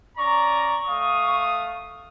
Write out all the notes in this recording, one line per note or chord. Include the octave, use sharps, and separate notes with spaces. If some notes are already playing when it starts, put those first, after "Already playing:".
C#4 D5 A#5 C#6
A3 F5 D#6